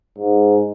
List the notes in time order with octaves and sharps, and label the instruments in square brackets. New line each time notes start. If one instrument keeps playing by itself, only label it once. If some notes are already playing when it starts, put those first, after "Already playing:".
[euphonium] G#2